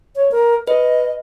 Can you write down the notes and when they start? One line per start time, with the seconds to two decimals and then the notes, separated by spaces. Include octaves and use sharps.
0.16 C#5
0.32 A#4
0.68 B4 D#5